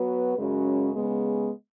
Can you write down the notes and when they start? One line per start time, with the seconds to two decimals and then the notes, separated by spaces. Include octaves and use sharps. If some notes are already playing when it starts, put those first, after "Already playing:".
Already playing: F#3 B3 F#4 B4
0.36 F#2 C#3 G#3 C#4 F#4
0.94 C#3 G#3 B3